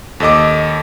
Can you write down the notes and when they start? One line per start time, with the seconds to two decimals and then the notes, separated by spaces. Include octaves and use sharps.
0.20 D#2 A4 D#5 D6